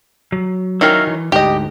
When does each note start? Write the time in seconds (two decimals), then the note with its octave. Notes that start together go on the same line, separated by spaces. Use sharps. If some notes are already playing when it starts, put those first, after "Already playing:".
0.32 F#3
0.81 D#3 F#3 C#4 E4 F5 A#5
1.07 E3
1.32 D2 G#2 G4 D#5